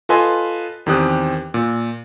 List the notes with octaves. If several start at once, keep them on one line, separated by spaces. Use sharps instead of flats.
F4 A4 B4 D#5 G#5 C6
E2 D#3 C4 G4 D#6 F#6
A#2